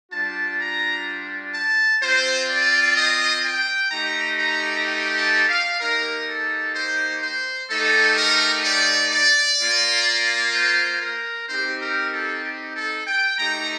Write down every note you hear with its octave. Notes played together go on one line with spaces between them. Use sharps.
G3 D4 F4 A5
A#5
A5
C4 F4 C5
D5
D#5
G5
A3 D#4 G4 A#5
A#5
G5
A5
F5
A#3 D#4 G4 A#4
A4
C5
C5
A3 D#4 G4 A4
A#4
D5
D5
A#3 F4
C5
A#4
C4 D#4 G4 C5
A#4
A4
G4
A4
G5
A3 D#4 G4 A#5